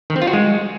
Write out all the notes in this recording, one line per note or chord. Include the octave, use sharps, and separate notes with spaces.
D#3
C4
F4
F#4
G#3